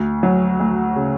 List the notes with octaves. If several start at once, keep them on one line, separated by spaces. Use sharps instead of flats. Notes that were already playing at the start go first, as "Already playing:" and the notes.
Already playing: D2
F#3
D2
C#3